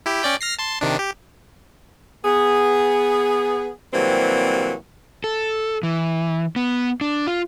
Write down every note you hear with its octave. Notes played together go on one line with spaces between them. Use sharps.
E4 G4
C#4 D5 G5
F6 A#6 C7
A5 C6
C3 D#3 D4
G4
B3 G#4
C3 E3 F#3 G3 A#3 C4
A4
E3
B3
D4
F4